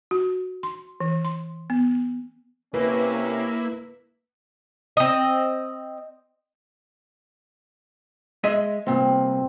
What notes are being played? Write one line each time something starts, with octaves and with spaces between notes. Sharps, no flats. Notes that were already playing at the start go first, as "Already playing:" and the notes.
F#4
C6
E3
C6
B3
C3 A#3 C#4 E4 B4
C4 D#5
G#3 D#5 E5
C2 A#2 C4